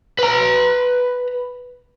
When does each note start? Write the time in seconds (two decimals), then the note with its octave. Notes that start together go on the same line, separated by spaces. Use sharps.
0.19 B4 A#5